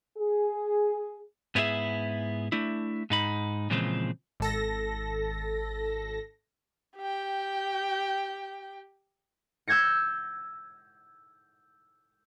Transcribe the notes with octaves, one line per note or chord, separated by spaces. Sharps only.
G#4
G#2 B3 E4 G4 G#4 E5
A3 D4 E4
G#2 D#4 B5
A#2 C#3 E3 F3 G#3 C4
G#1 A4 A#6
G4 G5
E6 G6 G#6 A#6 C#7